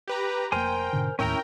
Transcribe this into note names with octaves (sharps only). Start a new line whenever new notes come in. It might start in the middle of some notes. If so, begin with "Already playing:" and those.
G4 B4 A#5
F1 A#3 A#4 C5 G5 G#5
G#2 B2 D3
D#2 A2 C#4 E4 A#4 G5 A#5